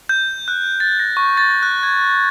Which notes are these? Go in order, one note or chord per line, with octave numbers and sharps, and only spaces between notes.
G6
F#6
A6
A#6
C#6
A6
F#6
G#6